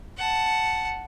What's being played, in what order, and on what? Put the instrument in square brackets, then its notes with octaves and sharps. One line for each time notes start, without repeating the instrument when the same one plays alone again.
[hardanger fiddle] F#5 A5